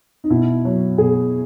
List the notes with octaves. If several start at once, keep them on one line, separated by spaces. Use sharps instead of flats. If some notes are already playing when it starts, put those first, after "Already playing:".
D#4
B2 E4
F#3
B2 G#4